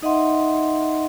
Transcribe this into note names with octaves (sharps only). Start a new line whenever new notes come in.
D#4 D#5 E5 F#5 C6